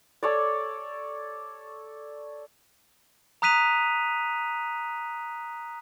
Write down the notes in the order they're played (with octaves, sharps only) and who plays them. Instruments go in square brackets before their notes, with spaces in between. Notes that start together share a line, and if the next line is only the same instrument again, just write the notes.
[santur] A4 C#5 D5
[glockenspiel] A#5 D#6 F#6 B6 D#7 F7